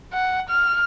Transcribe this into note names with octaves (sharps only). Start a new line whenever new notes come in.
F#5
F6